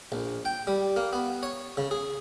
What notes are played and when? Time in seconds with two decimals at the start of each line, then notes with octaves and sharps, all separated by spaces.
0.12 A#1
0.45 G5
0.67 G3
0.96 A#3
1.13 B3
1.43 C#5
1.77 C#3
1.91 G#4